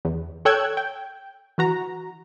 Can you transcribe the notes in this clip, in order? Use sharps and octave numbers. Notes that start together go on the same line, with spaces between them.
E2
A4 C#5 G5 E6 F#6 G#6
G5
E3 F#4 A#5